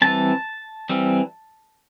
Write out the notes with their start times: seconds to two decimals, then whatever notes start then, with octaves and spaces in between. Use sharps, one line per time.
0.02 E3 G3 C4 A5
0.89 E3 G3 C4